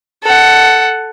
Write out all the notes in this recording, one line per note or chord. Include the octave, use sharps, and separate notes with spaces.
A4 F#5